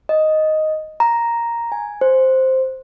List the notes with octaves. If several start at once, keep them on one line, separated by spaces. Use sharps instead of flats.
D#5
A#5
G#5
C5